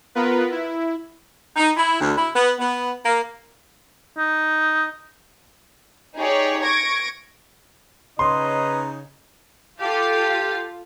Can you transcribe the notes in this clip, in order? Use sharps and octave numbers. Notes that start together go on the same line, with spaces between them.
B3 F4 A#4 B4
E4
D#4
E4
D2
E4
B3
B3
A#3
D#4
D#4 G4 G#4 C#5 D5
C#6 G#6 A#6 D7
C#3 D#4 B4 C#5 D#5 A#5 C6
F4 G4 A4 F5